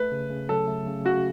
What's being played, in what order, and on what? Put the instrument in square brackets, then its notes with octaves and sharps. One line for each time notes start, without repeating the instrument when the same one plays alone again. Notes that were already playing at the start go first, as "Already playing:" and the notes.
Already playing: [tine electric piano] A3 [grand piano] B4
[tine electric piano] C#3
C#3
[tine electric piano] F#3 [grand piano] A4
[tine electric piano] A3
C#3
[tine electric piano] C#3 [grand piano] F#4